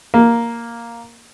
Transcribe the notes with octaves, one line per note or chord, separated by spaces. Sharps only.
A#3